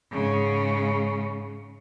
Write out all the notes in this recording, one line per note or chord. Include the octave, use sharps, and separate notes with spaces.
G#2 C#3